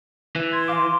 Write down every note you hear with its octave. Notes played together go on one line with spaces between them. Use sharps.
E3
C6 G#6
F5 D6